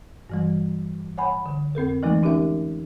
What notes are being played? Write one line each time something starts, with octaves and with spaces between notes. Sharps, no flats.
G2 E3 G3
C#5 F#5 G#5 B5
D3
F2 C4 A4 A#4
E3 F3 G#3 A3 D#4
C#4 D#4 G4 A#4 E5